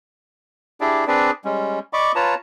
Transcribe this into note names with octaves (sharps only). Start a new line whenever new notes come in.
D4 E4 G4 G#4 D5
C4 D4 G#4 B4 D5
G3 G#3 C#4
D5 D#5 B5 C#6 D6
F4 B4 C#5 A5 A#5